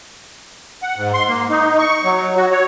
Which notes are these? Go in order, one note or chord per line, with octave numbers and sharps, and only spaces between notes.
F#5
G#2
C6
A#3
D#4
C#6
F#3
F#4
C#5